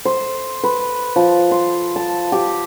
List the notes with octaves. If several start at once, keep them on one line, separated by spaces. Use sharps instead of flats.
C5
B4
F3
C6
A5
G4